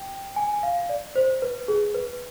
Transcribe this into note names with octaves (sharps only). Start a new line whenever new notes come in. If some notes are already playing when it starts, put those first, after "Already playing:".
Already playing: G5
G#5
F5
D5
C5
B4
G#4
B4